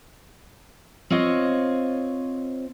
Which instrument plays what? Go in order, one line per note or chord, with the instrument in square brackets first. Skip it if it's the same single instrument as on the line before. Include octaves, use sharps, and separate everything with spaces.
[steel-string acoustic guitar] C4 F4 C#5 D#5